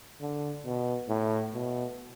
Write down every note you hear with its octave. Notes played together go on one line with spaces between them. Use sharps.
D3
B2
A2
B2